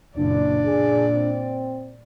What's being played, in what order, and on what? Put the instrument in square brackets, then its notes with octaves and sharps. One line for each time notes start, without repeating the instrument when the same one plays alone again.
[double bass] F#1 A#2 [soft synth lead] D4 [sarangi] D5
[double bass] A#2 [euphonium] G#4
[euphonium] C4